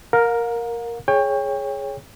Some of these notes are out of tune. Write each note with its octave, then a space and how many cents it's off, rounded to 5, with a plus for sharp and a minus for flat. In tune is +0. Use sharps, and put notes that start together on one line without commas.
A#4 +0 F5 +40
G#4 +10 C#5 +0 G5 +30